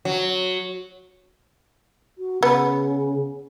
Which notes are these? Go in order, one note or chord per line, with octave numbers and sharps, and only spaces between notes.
F#3
F#4
C#3 B3